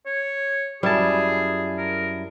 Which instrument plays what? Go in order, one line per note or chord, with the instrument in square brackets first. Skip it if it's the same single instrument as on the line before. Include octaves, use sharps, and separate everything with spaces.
[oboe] C#5
[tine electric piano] F#2 E4 A5 [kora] G3 [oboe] G#4
[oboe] A#4